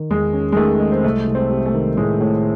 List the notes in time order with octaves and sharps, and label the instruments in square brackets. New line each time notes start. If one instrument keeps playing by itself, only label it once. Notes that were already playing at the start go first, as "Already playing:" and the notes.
Already playing: [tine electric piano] D#3
[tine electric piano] E2 [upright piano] G#3
[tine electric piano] C#4
[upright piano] G#3
[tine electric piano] D#3 [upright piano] A3
[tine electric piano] G#3
[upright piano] C4
[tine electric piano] C2 [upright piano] A3
[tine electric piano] C2
[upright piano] C4
[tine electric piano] C3
[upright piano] A3
[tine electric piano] D#3
[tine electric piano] A2 [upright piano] G#3
[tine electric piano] A2